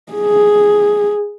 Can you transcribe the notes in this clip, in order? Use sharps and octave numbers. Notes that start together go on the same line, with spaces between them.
G#4